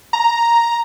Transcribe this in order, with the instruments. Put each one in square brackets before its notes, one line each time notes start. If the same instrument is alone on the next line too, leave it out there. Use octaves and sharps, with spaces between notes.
[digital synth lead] A#5